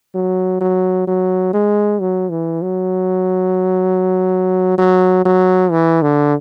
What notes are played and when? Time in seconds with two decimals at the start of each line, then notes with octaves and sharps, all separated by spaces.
0.15 F#3
0.61 F#3
1.07 F#3
1.54 G#3
2.01 F#3
2.31 E3
2.62 F#3
4.78 F#3
5.25 F#3
5.71 E3
6.02 D3